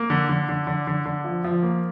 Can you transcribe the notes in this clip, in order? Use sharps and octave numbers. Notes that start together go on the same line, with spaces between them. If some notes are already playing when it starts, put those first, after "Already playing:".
Already playing: A#3
D3
D3
D3
D3
D3
D3
F3
F3
A#3